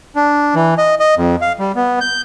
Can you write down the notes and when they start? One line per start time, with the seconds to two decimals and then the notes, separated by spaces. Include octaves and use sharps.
0.16 D4
0.55 E3
0.78 D#5
1.00 D#5
1.17 F2
1.41 F5
1.59 G3
1.76 B3
2.01 G6